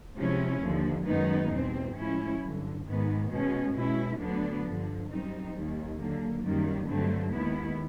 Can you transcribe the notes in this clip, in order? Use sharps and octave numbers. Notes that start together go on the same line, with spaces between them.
C3 F3 G#3 C#4 E4
D#2 D3 F3
F#2 D#3 G#3 B3 D#4
E2 B2 G3 C4
A2 F3 G#3 C#4 E4
G2 D3 F#3
G#2 D#3 G#3 B3
B2 G#3 C#4
B2 G#3 C#4 E4
D2 D3 F#3 B3 D4
G2 D3 F3
F#2 D#3 G3 C4 D#4
D#2 D#3 G3
D3 F#3 A#3
F#2 D#3 G3 A#3
G2 D3 F#3 A3 C4
D#2 D#3 G#3 B3 E4